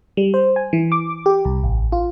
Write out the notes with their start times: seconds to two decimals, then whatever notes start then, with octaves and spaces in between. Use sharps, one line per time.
0.17 G3
0.34 C5
0.56 G#5
0.73 E3
0.92 D6
1.26 G4
1.45 C2
1.63 A1
1.92 F4